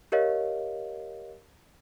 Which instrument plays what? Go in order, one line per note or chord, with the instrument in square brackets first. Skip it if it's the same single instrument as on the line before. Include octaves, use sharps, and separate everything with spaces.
[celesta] G4 A#4 C#5 D#5 F5